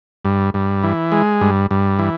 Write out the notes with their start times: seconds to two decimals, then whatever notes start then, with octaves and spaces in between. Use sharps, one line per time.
0.25 G2
0.54 G2
0.83 E3
1.12 G#3
1.41 G2
1.71 G2
1.99 E3